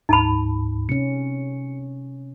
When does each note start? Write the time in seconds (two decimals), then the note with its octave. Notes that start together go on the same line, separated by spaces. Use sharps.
0.09 D2 G#2 D#4 A5 B5
0.89 C3 C#4 C#7